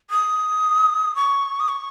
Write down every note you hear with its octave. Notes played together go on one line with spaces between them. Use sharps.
D#6
C#6
D#6
C#6